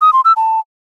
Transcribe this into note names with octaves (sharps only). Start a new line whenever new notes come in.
D#6
C6
E6
A5